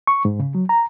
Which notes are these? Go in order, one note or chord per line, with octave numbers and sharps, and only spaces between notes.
C#6
G#2
C#3
F#3
A#5